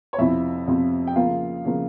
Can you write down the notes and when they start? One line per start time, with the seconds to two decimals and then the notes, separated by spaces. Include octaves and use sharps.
0.13 C#5
0.19 F2 C3 F3 C4 E4 E5
0.68 F2 C3 F3 C4
1.07 G5
1.16 C#3 F3 A#3 F4 F5
1.65 C#3 F3 A#3